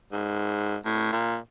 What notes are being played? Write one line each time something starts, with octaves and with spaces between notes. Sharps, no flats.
G#2
A2
A#2